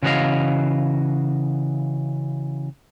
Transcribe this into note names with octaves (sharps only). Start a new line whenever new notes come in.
C#3 E3 F#4 G#4 D#5 F5